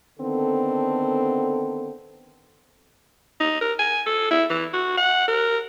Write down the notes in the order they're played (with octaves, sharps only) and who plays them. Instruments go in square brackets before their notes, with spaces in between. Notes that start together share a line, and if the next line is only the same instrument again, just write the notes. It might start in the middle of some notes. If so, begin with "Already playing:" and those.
[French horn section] D3 D#3 B3 C4 A4
[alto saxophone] D#4
A#4
G#5
A4
E4
E3
F#4
F#5
A#4